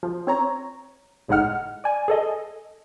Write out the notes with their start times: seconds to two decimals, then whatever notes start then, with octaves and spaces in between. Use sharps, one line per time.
0.03 F3
0.27 C4 C#5 A#5
1.28 G1 A2 G#3 D#4 F#5 F6
1.84 D5 G#5
2.08 G#4 A4 D#5